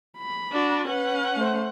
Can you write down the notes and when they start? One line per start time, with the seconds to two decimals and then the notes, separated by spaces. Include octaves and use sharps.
0.18 B5
0.53 D4 F#4
0.88 C#4 B4 F#5
1.37 A3 C5